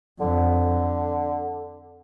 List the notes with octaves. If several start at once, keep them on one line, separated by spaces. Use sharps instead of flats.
F2 D3